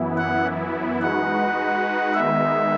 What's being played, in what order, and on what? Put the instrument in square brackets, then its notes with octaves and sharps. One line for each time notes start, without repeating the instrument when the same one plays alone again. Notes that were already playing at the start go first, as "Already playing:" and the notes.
Already playing: [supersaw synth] F#2 E3 B3 E4
[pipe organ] F#5
[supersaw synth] G#3 D#4 F#4 B4 [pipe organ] F#5
[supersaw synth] D#3 G#3 B3 D#4 [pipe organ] E5